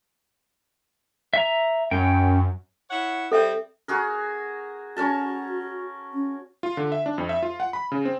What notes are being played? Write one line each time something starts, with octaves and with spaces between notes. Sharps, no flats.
E5 A#5
F#2 C#4 G5
E4 C#5 F#5
G3 C4 A4 E5
F#4 G#4 A#4
C#4 F#4 A#4 A5
C#4
F4
D3
E5
D4
F2
E5
F4
F#5
B5
C#3
C4